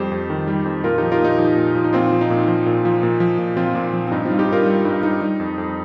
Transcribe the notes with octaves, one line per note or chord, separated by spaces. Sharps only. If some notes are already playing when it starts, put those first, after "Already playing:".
Already playing: F2 G3 G4 C5
F2
D#3
G3
F2
A#2 F4 A#4
F3 D#4 G4
F4 A#4
A#2 D#4 G4
F3
A#2
F3
D#4
A#2 C4 F4
F3
D#4
A#2
F3
A#2
F3
A#2
F3
A#2
F3 C4 F4
A#2
F3
C4
G2 D#4
C4 F4
G3
D#4 G4
G2 F4 A#4
G3
G2 D#4
G3 D#4
G3
F2
F2